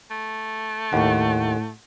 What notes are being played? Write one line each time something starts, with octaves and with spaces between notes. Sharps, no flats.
A3
D#2 A2 F#5 C#6